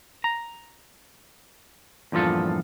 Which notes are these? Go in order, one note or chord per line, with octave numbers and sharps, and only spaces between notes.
A#5
E2 G2 A#2 F3 F4 A4